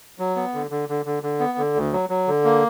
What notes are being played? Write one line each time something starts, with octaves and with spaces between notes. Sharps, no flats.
F#3
B3
D3
D3
D3
D3
D3
B3
D3
D2
F#3
F#3
D3
A#3